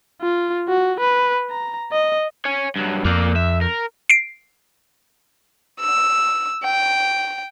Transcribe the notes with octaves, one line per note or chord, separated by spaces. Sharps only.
F4
F#4
B4
A#5
D#5
C#5 G#5
G2 F#3
F2 A#3 D5
E5
A#4
C7 D7
E6
G5